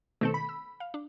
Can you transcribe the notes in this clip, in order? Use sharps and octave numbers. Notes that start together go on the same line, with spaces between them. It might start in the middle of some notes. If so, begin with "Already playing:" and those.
B2 D#3 A3 C4 A4 C#7
B5
E6
F5
D4